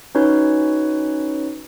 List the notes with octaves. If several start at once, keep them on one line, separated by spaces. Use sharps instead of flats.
C#4 D#4 F#4 B4 C#5